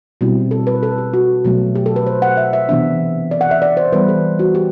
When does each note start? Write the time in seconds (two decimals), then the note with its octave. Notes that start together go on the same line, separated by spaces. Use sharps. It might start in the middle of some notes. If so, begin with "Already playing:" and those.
0.21 B2 G3 C4 E4
0.51 A4
0.67 B4
0.83 A4
0.98 G4
1.14 F#4
1.45 B2 F#3 A3
1.75 G4
1.86 A4
1.96 B4
2.07 C5
2.22 F#5
2.37 E5
2.53 E5
2.68 C3 E3 B3 D4 E5
3.31 D5
3.41 F#5
3.51 E5
3.62 D5
3.77 C5
3.92 E3 G3 B3 B4
4.09 A4
4.39 F#4
4.55 G4